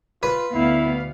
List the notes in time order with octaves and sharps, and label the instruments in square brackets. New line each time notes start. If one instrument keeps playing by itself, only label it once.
[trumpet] F4 [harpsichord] B4
[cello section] D2 B3 F5 [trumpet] E4